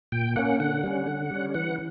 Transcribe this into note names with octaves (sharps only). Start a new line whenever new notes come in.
A#2 G5
A#3 C#4 F#5
D3 F#5
G3 C#4
D3
G3 C#4
E3 F#5